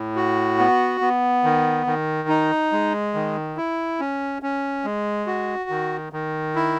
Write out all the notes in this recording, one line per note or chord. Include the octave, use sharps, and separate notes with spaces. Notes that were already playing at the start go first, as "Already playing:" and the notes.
Already playing: A2
F#4
B3
B3
D#3
D#3
D#4
G#3
D#3
E4
C#4
C#4
G#3
F#4
D#3
D#3
E4